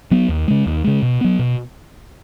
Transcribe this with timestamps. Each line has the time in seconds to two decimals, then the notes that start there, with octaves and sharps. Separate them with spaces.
0.11 F#3 B3
0.29 D#2
0.48 C#3 G#3
0.66 D#2
0.84 C#3 G#3
1.03 B2
1.21 F#3 B3
1.39 B2